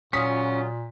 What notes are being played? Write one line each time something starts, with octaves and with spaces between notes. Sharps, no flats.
A#2 C#3 F#3 C#4 F4 D#6 B6